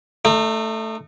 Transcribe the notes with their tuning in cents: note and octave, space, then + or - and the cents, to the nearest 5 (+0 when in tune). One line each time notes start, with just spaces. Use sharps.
A3 +5 D#4 -40